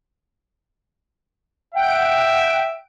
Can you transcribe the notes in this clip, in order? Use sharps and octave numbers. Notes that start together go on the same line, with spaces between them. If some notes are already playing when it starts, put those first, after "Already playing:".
E5 F#5 G5 D7